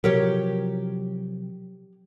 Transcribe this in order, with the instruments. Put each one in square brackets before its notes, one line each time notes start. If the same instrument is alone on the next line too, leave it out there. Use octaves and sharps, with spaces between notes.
[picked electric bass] C3 F3 F#3 [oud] G4 A#4 C#5